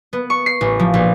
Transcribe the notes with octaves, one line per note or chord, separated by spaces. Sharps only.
B3
C#6
C7
A1
F3
A#1